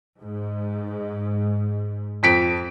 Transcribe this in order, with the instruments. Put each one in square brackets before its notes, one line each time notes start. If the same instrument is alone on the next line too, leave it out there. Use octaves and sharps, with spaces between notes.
[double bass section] G#2
[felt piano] F2 B6 D7